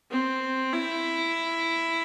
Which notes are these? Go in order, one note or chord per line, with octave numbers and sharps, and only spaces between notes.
C4
E4